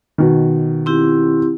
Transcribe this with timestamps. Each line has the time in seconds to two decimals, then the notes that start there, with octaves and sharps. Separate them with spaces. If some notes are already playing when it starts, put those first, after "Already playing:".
0.18 B2 D#3
0.86 C4 E4 G4